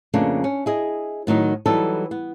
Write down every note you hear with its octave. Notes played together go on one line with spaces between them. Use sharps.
F2 C#3 A3 A#3 D4
C#4
E4 G#4 D#5
A2 D#3 F#3 D#4
E3 F#3 G3 D#4 A4
B3